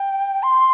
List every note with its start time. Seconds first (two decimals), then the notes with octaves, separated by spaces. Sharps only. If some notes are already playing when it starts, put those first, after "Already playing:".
Already playing: G5
0.43 C6